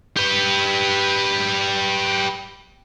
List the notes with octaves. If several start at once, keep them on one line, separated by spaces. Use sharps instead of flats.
G4 B4